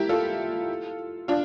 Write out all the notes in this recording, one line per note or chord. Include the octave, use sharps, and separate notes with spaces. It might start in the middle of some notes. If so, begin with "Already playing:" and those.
Already playing: E4 G4 A#4
F4 A4
D4 F4